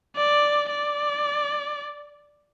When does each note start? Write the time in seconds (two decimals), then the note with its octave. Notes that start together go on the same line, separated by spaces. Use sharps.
0.16 D5
0.70 D5